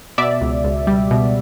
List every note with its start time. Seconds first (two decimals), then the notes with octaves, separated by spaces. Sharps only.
0.18 B2 D5 E5
0.41 C#2
0.64 C#2
0.87 G3
1.11 B2